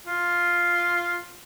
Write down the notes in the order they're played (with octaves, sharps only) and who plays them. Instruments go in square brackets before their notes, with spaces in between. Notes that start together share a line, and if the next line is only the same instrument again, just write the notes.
[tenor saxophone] F4